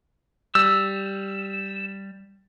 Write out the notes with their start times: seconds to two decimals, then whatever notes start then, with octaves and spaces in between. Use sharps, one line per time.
0.55 G3 E6